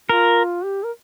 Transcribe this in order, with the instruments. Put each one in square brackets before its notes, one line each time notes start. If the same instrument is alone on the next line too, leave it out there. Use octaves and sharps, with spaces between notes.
[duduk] F4 [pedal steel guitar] A#4
[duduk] G4
A#4